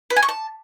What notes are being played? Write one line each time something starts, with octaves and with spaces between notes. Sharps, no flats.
B4
G#5
C#6
A5